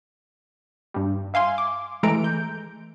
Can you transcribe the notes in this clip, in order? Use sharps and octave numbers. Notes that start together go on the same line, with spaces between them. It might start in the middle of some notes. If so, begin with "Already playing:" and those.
G2 G3
E5 F5 G#5 C6
D6
E3 G#3 A3 A4 A#5 D7
G6